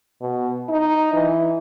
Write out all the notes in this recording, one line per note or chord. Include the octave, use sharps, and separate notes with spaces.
B2
D#4
E3